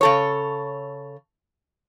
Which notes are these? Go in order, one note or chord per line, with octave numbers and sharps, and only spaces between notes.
C#3 A4 C#5